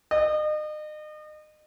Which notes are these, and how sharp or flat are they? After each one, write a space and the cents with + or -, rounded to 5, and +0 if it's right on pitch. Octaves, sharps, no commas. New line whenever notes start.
D#5 -35